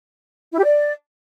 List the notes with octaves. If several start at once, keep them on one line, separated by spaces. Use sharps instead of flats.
E4
G4
D5